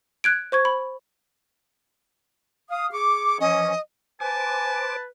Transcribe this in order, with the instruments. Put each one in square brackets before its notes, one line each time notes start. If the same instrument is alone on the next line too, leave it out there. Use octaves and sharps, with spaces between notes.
[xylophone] F#6 G#6 D7
C5 C#6 G#6
B5
[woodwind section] F5 D#6
G#4 C#6 D6
[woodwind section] E3 F3 C#4 [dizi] D#5
[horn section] B4 [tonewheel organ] C5 D6 [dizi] G#5 [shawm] A5